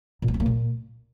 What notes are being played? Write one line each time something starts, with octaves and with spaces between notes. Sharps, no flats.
A#2
B3
C4
A#3
A#2